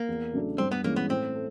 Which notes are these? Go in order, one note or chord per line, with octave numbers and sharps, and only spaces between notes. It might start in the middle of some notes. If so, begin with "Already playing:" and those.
Already playing: A#3
E2
C#3 F#3 A3 D4
G2 C4
B3
E3 G#3 A#3 C#4
B3
A2 C4
A3